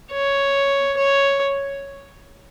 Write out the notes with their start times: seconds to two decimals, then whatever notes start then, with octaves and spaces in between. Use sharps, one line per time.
0.12 C#5
0.97 C#5